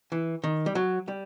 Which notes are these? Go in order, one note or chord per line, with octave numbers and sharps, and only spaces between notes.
E3
D#3
G3
F#3
G3